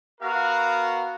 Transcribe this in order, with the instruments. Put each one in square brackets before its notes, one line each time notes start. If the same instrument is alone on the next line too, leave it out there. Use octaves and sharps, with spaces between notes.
[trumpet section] B3 F#4 A#4 F5